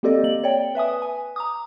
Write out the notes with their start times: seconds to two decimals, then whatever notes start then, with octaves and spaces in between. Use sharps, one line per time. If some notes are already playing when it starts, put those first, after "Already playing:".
0.03 A#3 C4 G4 A4 D5 D#5
0.24 A#3 F#7
0.44 C#5 D5 G5
0.75 B4 E5 G#5 D#6
1.02 G#5
1.36 A#5 D6 D#6